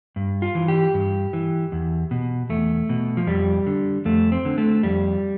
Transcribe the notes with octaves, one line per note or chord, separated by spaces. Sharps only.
G2
F4
E3
G4
G2
E3
E2
B2
E2 A3
B2
F3
F2 G3
D3
F2 A3
C4
D3
A3
F2 G3